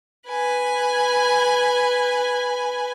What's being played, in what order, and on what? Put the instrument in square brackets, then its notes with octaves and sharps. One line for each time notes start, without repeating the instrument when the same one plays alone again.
[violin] B4 G#5